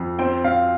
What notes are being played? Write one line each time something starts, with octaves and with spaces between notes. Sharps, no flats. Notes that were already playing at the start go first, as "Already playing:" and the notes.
Already playing: F2
C4 G5
C4 F5